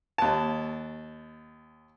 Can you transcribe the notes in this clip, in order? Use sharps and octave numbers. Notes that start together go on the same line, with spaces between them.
D#2 A5